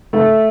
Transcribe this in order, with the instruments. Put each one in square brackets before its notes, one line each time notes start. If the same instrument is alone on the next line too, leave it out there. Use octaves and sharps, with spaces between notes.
[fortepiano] A3